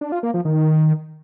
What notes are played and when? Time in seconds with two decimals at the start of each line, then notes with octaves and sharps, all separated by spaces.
0.01 D4
0.12 F4
0.23 A#3
0.34 F3
0.45 D#3